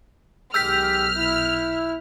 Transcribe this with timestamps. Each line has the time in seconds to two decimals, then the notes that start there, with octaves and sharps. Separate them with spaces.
0.54 B1 D#3 G#3 G4 E6 F6 G6 B6
1.16 E4